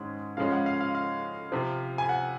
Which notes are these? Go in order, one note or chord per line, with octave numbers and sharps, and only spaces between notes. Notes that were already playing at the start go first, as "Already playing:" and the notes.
Already playing: G#2 D#3 G#3 C#4
C#3 F3 G#3 C#4 F5
F#5
F5
F5
F5
C3 F3 C4
G#5
F#5